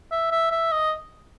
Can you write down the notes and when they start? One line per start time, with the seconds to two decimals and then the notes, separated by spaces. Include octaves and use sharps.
0.11 E5
0.31 E5
0.51 E5
0.72 D#5